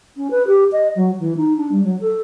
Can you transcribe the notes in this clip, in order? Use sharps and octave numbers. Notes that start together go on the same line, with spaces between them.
C#4
B4
G4
D#5
F#3
E3
D#4
D4
G3
F#3
A4